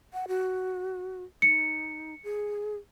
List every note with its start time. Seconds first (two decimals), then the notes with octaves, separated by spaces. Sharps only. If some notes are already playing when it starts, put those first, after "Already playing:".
0.14 F#5
0.28 F#4
1.42 D#4 C#7
2.24 G#4